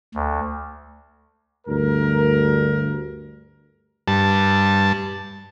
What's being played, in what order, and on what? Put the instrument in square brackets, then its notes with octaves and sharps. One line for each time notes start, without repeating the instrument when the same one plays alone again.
[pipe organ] D2
[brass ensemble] D2 G2 A#4
[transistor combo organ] G2 A5